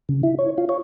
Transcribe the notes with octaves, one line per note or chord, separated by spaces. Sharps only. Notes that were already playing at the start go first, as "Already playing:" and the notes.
C#3
E4
C#5
F4
C#5